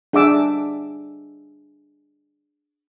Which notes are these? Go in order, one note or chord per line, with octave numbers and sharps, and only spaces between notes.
D4 G#4 E5 F#5 D6 E6